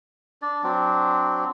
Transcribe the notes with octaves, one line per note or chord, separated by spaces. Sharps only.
D4 D5
F#3 C4 D4